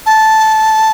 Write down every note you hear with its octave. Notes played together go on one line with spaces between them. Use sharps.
A5